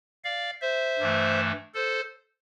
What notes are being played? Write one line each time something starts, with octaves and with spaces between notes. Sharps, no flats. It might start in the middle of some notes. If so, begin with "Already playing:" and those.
D5 F5
C5 E5
G2 E3 A3
A4 C5